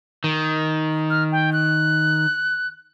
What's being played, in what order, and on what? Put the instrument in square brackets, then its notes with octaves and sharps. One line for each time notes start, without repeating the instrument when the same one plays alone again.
[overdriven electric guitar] D#3
[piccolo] F6
G5
F#6